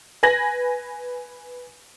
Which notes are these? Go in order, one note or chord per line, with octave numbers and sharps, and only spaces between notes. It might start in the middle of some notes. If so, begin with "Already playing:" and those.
B4 G#5 G#6 A#6 F#7